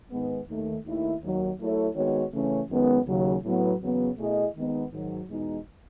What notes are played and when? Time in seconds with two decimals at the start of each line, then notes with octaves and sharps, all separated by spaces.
0.10 G#2 D#3 G#3 B3
0.47 D#2 D#3 A3
0.85 D#2 D#3 A3 E4
1.21 D#2 D#3 F#3
1.59 F#3 A3 E4 A4 C#5
1.95 D#3 G#3 B3 F#4 C#5
2.32 C#3 E3 A3 C#4
2.70 F#2 D#3 G#3 B3
3.06 D#2 C#3 F#3
3.44 A2 F#3 B3
3.81 E2 C#3 F#3 B3
4.17 B2 A3 E4 G#4 D#5
4.55 D#2 D#3 G#3 B3 D#4
4.91 G#2 D#3 F#3
5.28 E2 B2 G#3 D#4